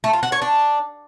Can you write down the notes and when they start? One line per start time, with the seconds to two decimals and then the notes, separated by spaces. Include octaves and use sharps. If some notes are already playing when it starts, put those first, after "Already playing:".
0.04 A3
0.13 F4
0.23 F#4
0.32 C#5
0.42 D4